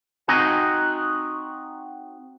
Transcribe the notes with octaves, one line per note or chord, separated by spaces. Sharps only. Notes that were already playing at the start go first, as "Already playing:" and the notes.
C4 D#4 F#4 G#5